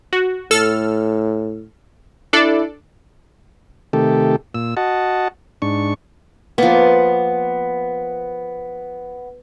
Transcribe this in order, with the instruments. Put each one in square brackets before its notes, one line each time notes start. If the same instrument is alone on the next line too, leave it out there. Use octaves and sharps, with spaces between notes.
[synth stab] F#4
[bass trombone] A2 [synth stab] A4 E6 F6
[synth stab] D4 A4 D5 [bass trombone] E4
[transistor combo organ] C3 D#3 A3 G4 A4
A#2 E6
F#4 D#5 F#5 A5
G#2 D4 C#6
[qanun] F3 A#3 [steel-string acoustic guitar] B3